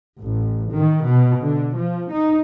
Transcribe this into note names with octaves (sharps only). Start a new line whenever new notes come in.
A1
D#3
B2
D3
F3
D#4